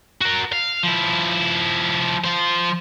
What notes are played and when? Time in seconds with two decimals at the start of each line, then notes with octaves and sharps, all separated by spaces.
0.21 F#4 A#4
0.52 F5
0.83 F3 E4
2.24 F3 C5